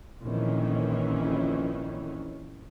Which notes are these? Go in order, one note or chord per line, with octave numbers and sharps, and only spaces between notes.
A#1 F2 D#3 E3 C#4